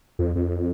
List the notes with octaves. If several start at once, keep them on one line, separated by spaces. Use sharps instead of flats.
F2
F2